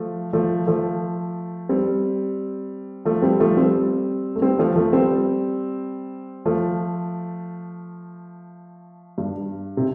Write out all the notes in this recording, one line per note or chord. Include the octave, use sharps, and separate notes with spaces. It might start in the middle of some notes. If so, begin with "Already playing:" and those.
Already playing: F3 A3
F3 A3
F3 A3
G3 C4
F3 A3
G3 C4
F3 A3
G3 C4
A3
G3 C4
F3 A3
F3 A3
G3 C4
F3 A3
G2
C3